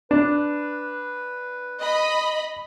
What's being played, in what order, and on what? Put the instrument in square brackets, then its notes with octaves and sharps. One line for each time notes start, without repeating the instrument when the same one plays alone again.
[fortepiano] D4 [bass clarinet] B4
[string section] D#5 B5